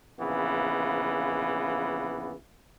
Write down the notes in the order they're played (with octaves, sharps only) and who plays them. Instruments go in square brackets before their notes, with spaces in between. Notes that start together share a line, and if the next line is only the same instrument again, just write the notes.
[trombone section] A#1 C#3 E3 B3